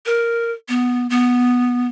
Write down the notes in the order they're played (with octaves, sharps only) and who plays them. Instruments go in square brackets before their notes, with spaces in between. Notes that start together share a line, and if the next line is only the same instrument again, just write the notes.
[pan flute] A#4
B3
B3